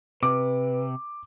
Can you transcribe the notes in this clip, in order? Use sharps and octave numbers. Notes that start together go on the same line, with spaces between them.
C3 B4 D6